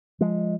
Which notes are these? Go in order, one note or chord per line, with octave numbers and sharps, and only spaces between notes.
F3 G#3